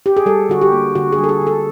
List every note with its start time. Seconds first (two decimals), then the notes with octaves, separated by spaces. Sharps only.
0.06 G4
0.17 G#4
0.26 G3 A4
0.49 D3 F#4
0.62 G4
0.72 A#3
0.95 D3 F#4
1.12 G#4
1.18 G3
1.24 A4
1.29 G#4
1.41 D3
1.47 A4